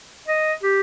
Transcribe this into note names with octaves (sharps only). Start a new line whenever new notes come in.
D#5
G4